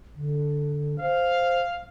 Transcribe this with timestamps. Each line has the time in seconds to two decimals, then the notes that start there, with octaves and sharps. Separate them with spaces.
0.15 D3
1.00 C5 F5